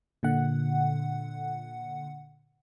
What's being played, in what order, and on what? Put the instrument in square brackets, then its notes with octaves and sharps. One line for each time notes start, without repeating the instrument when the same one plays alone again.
[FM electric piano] A#2 D3 F#5